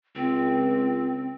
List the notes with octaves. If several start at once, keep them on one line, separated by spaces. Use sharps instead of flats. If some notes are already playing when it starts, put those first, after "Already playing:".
C#2 C4